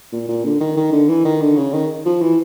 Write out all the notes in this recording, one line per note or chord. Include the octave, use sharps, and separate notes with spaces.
A#2
A#2
D3
D#3
D#3
D3
E3
D#3
D3
C#3
D#3
F3
E3